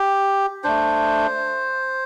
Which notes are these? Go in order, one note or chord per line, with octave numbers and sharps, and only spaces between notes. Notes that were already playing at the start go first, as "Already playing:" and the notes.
Already playing: G4
A3 D4 C5